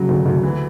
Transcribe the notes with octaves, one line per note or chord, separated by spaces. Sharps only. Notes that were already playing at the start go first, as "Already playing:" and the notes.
Already playing: C#3 F#3
D2
D2
E3